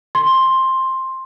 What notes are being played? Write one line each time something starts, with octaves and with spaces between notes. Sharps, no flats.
C6